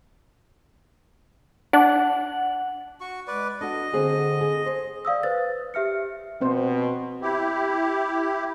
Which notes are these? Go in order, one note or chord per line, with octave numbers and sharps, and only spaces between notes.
D4 F#5
F#4 C#6
G#3 B4 D5
D4 F#4 A4 D#5
D3 C4 G#4
G#4
G#4 C5
D5 F5 D#6 E6
B4 C5 A6
G4 E5 F6 C#7
B2 C4 C5
E4 G4